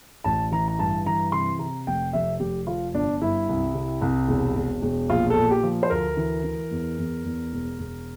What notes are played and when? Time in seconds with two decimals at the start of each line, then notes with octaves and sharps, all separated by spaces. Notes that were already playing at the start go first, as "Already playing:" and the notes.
0.24 A1 A5
0.52 E3 A#5
0.68 A#5
0.79 G2 A5
1.06 E3 A#5
1.32 C3 C6
1.59 C3 A#5
1.87 F1 G5
2.13 F1 E5
2.40 F1 G4
2.67 F3 F4
2.94 G1 D4
3.22 G2 E4
3.49 C2
3.75 C3
4.01 C2
4.28 E1
4.56 E1
4.82 E1
5.09 A#1 F4
5.30 A4
5.37 A#2
5.51 G4
5.63 F3
5.83 C5
5.90 D2 A#4
6.17 E3
6.44 E3
6.71 E2
6.98 E2
7.25 E2
7.53 E1
7.79 E1